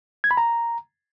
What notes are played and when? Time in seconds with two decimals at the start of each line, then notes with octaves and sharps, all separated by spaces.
0.24 G#6
0.31 B5
0.37 A#5